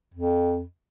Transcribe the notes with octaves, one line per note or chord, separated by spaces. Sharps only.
F2